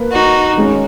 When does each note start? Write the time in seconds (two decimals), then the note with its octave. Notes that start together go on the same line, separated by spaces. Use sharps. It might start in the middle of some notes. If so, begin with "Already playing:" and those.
Already playing: A#3 B4
0.12 D#4 F#4
0.56 D#3 G#3 C#4